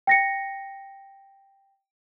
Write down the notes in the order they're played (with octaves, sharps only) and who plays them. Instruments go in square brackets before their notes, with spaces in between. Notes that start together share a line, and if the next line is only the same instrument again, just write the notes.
[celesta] G5 A#6 C#7